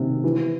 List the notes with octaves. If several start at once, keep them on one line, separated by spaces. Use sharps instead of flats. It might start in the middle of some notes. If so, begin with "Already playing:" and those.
Already playing: C3 D#3
E3